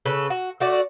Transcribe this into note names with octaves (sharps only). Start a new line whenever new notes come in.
C#3 A4 B4
F#4
A3 F#4 D5